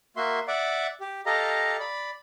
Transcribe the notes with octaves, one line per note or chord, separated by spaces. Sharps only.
A#3 F#4 E5 C6
D5 E5 F#5 D6
G4
G4 A4 D#5 F5 A#5
D5 B5